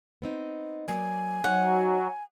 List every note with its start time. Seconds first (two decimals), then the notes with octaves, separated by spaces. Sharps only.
0.22 B3 C4 D#4
0.88 F#3 A#3 D5 G#5
1.44 F#3 D#4 C5 C#5 F#5